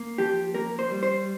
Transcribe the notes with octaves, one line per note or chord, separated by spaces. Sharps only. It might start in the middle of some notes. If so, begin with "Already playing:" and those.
Already playing: A#3
F3 G4
A#3 A#4
C5
G3
C5